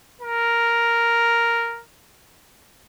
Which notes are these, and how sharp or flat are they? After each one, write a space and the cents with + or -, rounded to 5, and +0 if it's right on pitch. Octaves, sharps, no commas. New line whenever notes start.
A#4 +0